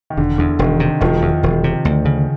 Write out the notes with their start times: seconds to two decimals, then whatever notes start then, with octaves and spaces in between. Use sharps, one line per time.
0.10 D#3
0.17 E1 D3
0.38 E2 D3
0.59 E1 D#3
0.80 C3
1.01 E1 D#3 F3
1.22 E2 D#3
1.43 E1
1.64 C3
1.85 D2
2.05 C#3